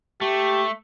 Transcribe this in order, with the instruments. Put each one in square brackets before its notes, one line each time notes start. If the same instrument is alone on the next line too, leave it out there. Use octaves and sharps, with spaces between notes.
[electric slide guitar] A3 [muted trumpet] G4